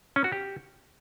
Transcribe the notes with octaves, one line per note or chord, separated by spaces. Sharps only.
C#4
F#4
G4